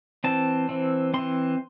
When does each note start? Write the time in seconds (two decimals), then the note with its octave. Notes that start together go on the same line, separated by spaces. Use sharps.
0.24 E3 C4 A5
0.69 E3 C4
1.14 E3 C4 C6